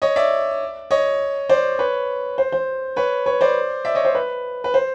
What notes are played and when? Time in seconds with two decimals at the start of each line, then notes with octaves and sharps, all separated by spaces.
0.02 C#5 D#5
0.16 D5 E5
0.91 C#5 D#5
1.49 C5 D5
1.79 B4 C#5
2.38 C5
2.52 C5
2.96 B4 C#5
3.26 B4 C#5
3.41 C5 D5
3.85 D5 E5
3.95 C#5 D#5
4.05 C5
4.15 B4
4.64 B4
4.74 C5